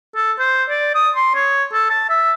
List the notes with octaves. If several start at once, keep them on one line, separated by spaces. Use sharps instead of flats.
A4
C5
D5
D#6
C6
C#5
A4
A5
E5